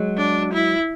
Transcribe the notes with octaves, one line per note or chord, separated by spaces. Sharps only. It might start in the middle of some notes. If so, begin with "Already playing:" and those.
Already playing: F#3 G#3
D4
E4